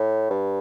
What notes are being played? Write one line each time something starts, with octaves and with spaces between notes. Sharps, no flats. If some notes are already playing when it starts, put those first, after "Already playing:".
Already playing: A2
G2